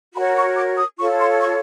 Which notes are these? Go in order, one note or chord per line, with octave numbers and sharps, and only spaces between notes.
F#4 A#4 C#5 B5
C#6
D6
D#6
F4 A4 C#5 C#6
C6
C#6